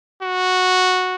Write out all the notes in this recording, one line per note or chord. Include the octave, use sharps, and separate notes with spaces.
F#4